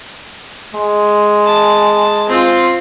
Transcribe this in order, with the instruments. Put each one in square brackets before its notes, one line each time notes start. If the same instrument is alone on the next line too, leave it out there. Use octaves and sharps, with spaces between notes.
[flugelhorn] G#3
[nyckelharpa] A5
C4 F4